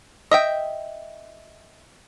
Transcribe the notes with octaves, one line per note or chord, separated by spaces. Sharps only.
D#5 E5 G5